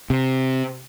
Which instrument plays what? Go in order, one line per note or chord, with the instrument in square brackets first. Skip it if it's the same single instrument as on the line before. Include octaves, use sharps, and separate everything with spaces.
[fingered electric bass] C3